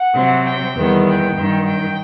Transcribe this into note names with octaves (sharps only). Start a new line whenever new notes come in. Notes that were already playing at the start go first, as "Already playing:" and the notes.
Already playing: F#5
C3 F#3 C4
G5
E2 D#3 G3 B3
G5
G2 D#3 F#3
G5